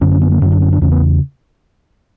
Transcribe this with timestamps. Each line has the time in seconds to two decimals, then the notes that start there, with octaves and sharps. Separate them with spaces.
0.01 F#2 D3 C#4
0.11 C#4
0.22 B3
0.32 A#3
0.42 F#2 D3 C#4
0.52 D4
0.62 C#4
0.72 D4
0.82 E2 C#3 C#4
0.92 B3